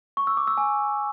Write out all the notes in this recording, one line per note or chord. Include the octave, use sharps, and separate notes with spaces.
C#6
E6
D6
E6
G#5